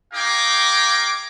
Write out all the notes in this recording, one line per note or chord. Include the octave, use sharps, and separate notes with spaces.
D#4 G#4 F5 G5 A#5 D6